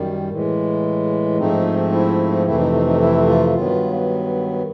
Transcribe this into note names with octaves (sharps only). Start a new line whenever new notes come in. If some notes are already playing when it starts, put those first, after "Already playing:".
Already playing: F#2 D#3 G3
A2 E3 G#3
G#2 F3 A3 C4 D#4
E4
F2 C3 E3 A3 C4 E4
D#4
D#4
D#4
E4
F4
G2 D#3 F#3 B3 F4